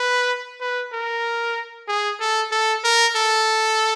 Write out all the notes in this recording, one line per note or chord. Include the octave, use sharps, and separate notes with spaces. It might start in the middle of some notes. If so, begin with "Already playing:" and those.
Already playing: B4
B4
A#4
G#4
A4
A4
A#4
A4